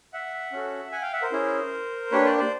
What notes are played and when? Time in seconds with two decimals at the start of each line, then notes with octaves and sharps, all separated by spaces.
0.13 E5 F#5
0.52 C#4 F#4 A4
0.92 F#5 G#5
1.02 F5 G5
1.13 E5 F#5
1.22 A#4 C5
1.32 C#4 E4 G#4
2.11 A#3 D4 G4 B4 C#5
2.24 C5 D5
2.38 C5 D5